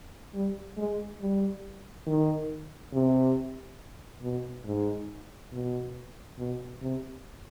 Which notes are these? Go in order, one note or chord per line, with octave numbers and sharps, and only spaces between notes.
G3
G#3
G3
D#3
C3
B2
G#2
B2
B2
C3